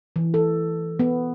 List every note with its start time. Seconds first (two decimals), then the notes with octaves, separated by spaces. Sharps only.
0.16 E3
0.34 A4
0.99 B3